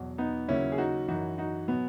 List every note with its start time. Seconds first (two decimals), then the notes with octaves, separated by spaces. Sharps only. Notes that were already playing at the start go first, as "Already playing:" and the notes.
Already playing: E2 B2 F#3
0.18 B3 D#4
0.48 D#2 C#3 F#3 C#4 E4
0.72 G#4
0.78 D#4 F#4
1.08 F#2 E3 D#4 F#4
1.38 D#4 F#4
1.68 B2 F#3 B3